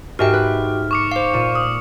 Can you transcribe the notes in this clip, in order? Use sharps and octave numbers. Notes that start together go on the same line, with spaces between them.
G#2 F#4 G4 A#4 E5 G5 F6
B4
C#6 D6 C#7
C5 F5
A#2 D#7
D#6